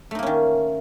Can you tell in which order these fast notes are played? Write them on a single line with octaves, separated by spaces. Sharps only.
A3 D#4 A#3 C#4 D#3